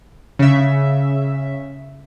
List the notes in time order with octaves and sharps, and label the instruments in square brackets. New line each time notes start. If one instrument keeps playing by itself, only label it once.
[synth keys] C#3 E5